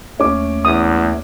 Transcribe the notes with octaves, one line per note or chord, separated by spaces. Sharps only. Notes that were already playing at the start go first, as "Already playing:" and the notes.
D#2 A3 C#4 D6
E2 D#6